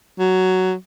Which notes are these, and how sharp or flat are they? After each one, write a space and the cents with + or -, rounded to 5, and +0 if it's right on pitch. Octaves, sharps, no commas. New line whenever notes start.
F#3 +10